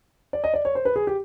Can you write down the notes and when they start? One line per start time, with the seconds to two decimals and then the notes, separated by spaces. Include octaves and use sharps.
0.33 D5
0.44 D#5
0.54 D5
0.65 C#5
0.75 C5
0.85 B4
0.96 G#4
1.07 G4